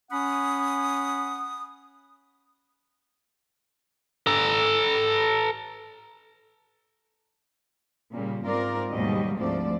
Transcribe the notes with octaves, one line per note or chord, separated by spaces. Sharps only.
C#4 F#5 B5 D#6
A4 A#5
A#2 C#3 G3 A#3
G#2 C4 F4 A#4 D5
D#2 G#2 B2 F#3 G3 D#5
D2 G#2 F3 A3 C4 D5